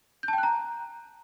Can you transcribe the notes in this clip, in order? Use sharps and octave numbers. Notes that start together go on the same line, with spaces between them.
G6
A5
G5
F#6
A#5